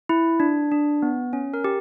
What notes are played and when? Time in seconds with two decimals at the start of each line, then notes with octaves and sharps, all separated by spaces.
0.09 E4
0.40 D4
0.72 D4
1.02 B3
1.33 C#4
1.54 A#4
1.64 G4